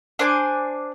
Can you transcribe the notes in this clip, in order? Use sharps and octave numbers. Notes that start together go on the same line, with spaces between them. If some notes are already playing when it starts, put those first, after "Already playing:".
D4 C5 G#5 D6